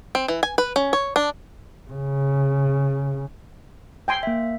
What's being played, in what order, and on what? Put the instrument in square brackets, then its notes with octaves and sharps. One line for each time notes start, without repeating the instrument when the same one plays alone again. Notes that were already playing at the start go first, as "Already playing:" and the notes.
[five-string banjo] C4
E3
G#5
B4
C#4
C#5
D4
[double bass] C#3
[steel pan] G5 G#5 C6
[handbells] A#3 E5